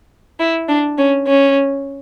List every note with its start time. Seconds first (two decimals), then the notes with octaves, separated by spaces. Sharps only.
0.40 E4
0.68 D4
0.98 C#4
1.28 C#4